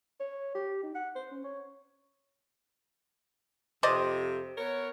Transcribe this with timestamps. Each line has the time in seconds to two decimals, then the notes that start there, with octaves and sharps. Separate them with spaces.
0.20 C#5
0.55 G4
0.83 D#4
0.95 F#5
1.16 C5
1.31 C#4
1.44 C#5
3.83 F2 C3 C5 D5 D#5
4.57 B3 A#4 C#5